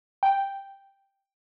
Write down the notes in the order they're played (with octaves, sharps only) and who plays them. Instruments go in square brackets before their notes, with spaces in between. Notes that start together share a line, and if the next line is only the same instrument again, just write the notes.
[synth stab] G5